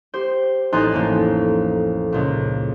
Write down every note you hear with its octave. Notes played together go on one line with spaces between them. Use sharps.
G4 C5
A1 D#4 G#5 C6 F#6 A6
A1 F2 A#3
C#2 A#2